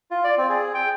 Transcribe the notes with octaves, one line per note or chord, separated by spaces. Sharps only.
F4
D5
C4
G#4
G5